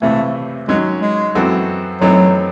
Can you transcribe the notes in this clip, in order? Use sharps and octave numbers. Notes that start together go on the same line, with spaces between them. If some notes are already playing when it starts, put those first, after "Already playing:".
C#2 C3 E3 A3
D#3 F#3 G#3 C#4
G#3
F#2 E3 C4 F#4 A4
F#2 E3 F#3 A3 C4 D#4